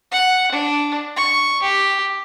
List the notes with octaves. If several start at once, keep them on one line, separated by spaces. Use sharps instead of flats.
F#5
D4
C#6
G4